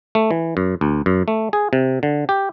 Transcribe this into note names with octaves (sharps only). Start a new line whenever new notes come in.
A3
E3
F#2
D2
F#2
A3
G#4
C3
D3
G4